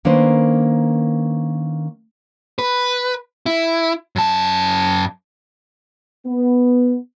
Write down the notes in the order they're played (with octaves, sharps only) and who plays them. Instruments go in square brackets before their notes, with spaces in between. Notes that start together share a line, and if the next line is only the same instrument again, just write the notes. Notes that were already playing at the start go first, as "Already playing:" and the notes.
[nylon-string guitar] D#3 A#3 C#4 D4 B4 C5
[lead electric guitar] B4
E4
F#2 A5
[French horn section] B3